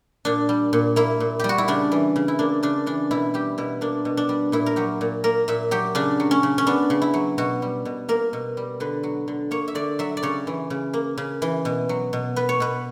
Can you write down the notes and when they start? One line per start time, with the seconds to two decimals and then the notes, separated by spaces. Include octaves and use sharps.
0.25 A#2 D4
0.49 G3
0.73 A#2
0.96 A#3 E4
1.20 A#2
1.39 G3 G4
1.49 F#4
1.58 E4
1.68 C#3 D4
1.92 E3
2.16 C#3
2.28 E4
2.39 A#3 D4
2.63 C#3 D4
2.86 E3 D4
3.11 B2 E4
3.34 G3 G4
3.58 B2 E4
3.81 A#3 D4
4.05 B2
4.17 D4
4.29 G3
4.52 A#2 E4
4.66 A#4
4.76 F#3 G4
5.01 A#2
5.24 A#3 A#4
5.48 A#2 E5
5.71 F#3 G4
5.95 C#3 D4
6.20 F#3
6.31 C#4
6.43 C#3
6.58 C#4
6.67 B3 D4
6.90 C#3
7.02 E4
7.14 F#3
7.38 B2 F#4
7.62 G3
7.85 B2
8.09 A#3 A#4
8.33 B2
8.57 G3
8.80 D3 B4
9.03 F#3
9.28 D3
9.51 A#3 C#5
9.68 E5
9.75 D3 D5
9.99 F#3 E5
10.17 D5
10.23 C#3 C#5
10.47 E3
10.70 C#3
10.93 A#3
11.18 C#3
11.42 E3
11.65 B2
11.89 F#3
12.13 B2
12.36 B3 B4
12.49 C#5
12.60 B2 B4